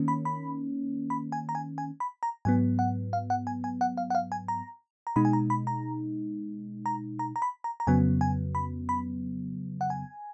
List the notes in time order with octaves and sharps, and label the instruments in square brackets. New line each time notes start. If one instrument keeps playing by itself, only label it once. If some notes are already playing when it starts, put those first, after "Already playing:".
Already playing: [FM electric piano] D#3 A#3 C#4
B5
B5
B5
G#5
A#5
G#5
G#5
B5
A#5
G#2 F#3 B3 G#5
F#5
F5
F#5
G#5
G#5
F#5
F5
F#5
F5
G#5
A#5
A#5
B2 G#3 D#4 B5
G#5
A#5
B5
A#5
A#5
A#5
A#5
B5
A#5
A#5
F2 C#3 F#3 B3 G#5
G#5
B5
B5
F#5
G#5